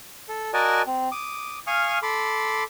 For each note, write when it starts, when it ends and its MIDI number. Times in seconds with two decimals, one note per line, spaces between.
0.29 0.51 69
0.54 0.82 66
0.54 0.82 70
0.54 0.82 74
0.54 0.82 75
0.54 0.82 80
0.54 0.82 81
0.87 1.09 60
1.12 1.59 86
1.12 1.59 87
1.67 1.99 77
1.67 1.99 80
1.67 1.99 85
1.67 1.99 87
1.67 1.99 89
2.03 2.64 69
2.03 2.64 83
2.03 2.64 84
2.03 2.64 86